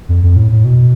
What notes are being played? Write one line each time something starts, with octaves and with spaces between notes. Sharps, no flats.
F2
F2
A2
A2
B2